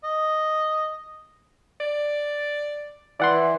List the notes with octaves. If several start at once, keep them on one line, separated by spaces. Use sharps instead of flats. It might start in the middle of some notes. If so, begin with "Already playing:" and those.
D#5
D5
E3 D5 F#5 C6